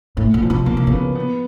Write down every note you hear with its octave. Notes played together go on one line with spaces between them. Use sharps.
A2
A#2
F3
B2
C#3 A#3
C3
A#3
C#3 B3
B3